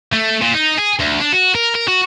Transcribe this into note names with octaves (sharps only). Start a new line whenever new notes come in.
A3
A#2
D#4
G#4
D2
D4
F#4
A#4
A#4
F#4